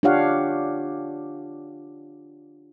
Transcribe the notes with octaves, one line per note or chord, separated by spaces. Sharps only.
D4 F4 G4 C#5 F5 F#5